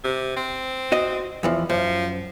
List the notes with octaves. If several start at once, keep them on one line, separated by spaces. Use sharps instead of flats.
C3
C4
F#4 D#5
E2 E3 F3
F#2 F3